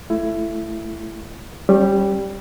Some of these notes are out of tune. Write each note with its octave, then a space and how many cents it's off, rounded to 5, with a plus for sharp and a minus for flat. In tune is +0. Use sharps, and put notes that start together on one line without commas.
A3 +0 E4 +20
G3 +0 C#4 -30